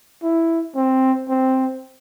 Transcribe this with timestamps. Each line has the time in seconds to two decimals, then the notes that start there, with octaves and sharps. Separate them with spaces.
0.23 E4
0.75 C4
1.29 C4